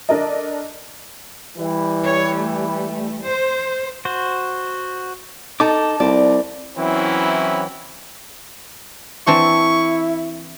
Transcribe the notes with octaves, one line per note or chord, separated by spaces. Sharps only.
D4 A4 A#4 D5 D#5
E3 G3
C#5
A3
C5
F#4 C5
D#4 A4 A5 D6
C2 D5
E3 F#3 C4 C#4 E4
E3 C4 D4 E4 C#6